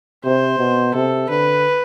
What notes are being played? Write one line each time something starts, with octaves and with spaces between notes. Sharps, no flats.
C3 C5
B2
C3 A4
D3 B4